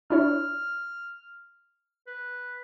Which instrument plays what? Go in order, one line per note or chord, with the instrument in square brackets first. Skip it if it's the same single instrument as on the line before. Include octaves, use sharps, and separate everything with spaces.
[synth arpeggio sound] D4 E4 C#5 [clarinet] F6
[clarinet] B4